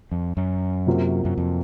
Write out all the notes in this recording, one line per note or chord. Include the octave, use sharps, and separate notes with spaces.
F2
F#2
C3 F#3 A#3 F4 C5
F#2
F2